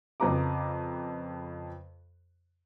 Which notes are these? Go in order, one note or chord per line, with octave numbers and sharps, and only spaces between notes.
F2 C#3 B4 A#5 D6